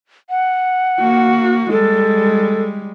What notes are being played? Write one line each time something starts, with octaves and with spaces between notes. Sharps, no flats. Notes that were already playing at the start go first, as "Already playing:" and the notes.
F#5
A#3 F#4
G3 G#3 A4